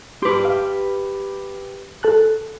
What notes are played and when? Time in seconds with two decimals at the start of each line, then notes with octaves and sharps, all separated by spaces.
0.22 G4 B4 C6 D6
0.45 F5
2.03 A4 A5 F#6